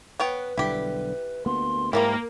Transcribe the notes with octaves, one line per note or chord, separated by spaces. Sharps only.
B3 B4 C#5 G5
B1 D3 G3 E4 G4
D2 A#3 B3 C6
G#2 E3 F3 G3 A#3 A#4